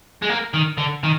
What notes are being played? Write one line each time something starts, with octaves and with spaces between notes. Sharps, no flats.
G#3
A#3
D#3
D3
D#3